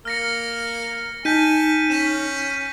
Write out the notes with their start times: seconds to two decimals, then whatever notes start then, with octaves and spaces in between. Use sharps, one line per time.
0.05 A#3 F6 A#6 C#7
1.25 D#4 G#5 A5 G6 B6 D#7
1.90 C#4 B6 E7